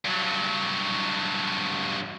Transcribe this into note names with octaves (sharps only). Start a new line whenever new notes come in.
G2 F#3